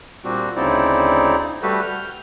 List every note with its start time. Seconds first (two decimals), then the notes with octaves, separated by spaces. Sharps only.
0.24 A#2 G3 C4 D4 F#4
0.56 D2 C#3 C4 D#4 E4 D5
1.62 G3 A3 F#4 G4 A4 B4
1.82 F6 G6